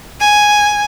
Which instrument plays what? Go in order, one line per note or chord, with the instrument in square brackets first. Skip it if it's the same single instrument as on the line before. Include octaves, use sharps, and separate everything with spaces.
[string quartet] G#5